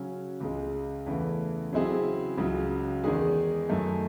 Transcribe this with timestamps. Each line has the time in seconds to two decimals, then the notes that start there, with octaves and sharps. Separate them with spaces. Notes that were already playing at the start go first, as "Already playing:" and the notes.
Already playing: C#3 F#3 C#4
0.40 C#2 C#3 G#3
1.06 E2 C#3 E3 A3
1.72 C#3 F#3 C4 E4 G#4
2.38 C#2 C#3 F#3
3.04 E2 D#3 G#3 D#4 G#4
3.69 F#2 D#3 A3